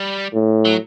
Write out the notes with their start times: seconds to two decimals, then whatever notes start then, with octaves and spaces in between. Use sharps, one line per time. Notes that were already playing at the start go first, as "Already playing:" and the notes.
Already playing: G3
0.34 A2
0.65 F#3